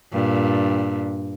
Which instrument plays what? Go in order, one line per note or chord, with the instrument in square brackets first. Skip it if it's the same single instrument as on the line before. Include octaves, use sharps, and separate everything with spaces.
[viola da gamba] G2 A#2